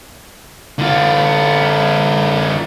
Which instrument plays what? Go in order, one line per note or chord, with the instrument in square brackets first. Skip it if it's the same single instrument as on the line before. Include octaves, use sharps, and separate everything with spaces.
[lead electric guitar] D3 F4